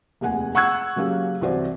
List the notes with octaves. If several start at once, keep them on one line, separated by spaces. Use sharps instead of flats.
F1 D#2 G#4 F#5 G#5
F#5 C#6 E6 F#6 G#6
C#3 F#3 A#3 C#4 G4
C2 E3 F#4 C5 D5